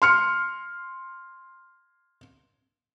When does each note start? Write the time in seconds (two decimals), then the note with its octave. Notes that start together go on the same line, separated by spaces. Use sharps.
0.02 C6 F6 C#7